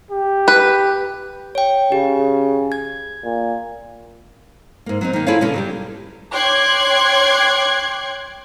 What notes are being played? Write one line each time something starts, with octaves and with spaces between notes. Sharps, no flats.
G4
B4
C#5 G5
C#3 G4
G#6
A#2
G#2 A#3
F#3 C4 D#4
D#3 A#3
E4 F4 G#4 A4 C#5 F5
B2 D3 C#4
F#3 G3 G4
C#5 G5 C6 D6 F#6 G#6